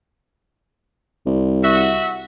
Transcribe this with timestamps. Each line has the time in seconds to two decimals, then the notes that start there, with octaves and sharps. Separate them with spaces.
1.26 C2
1.63 F#4 E5